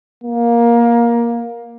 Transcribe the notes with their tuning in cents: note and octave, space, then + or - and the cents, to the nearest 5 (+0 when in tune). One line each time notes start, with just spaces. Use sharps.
A#3 +15